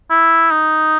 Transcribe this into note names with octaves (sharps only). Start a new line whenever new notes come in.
E4
D#4